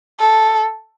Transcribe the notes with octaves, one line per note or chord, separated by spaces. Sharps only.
A4